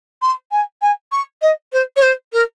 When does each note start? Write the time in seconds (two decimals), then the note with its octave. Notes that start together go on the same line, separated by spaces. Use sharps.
0.22 C6
0.52 G#5
0.82 G#5
1.12 C#6
1.42 D#5
1.73 C5
1.96 C#5
2.02 C5
2.33 A#4